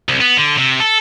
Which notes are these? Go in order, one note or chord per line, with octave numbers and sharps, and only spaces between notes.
C2
B3
D3
C3
A4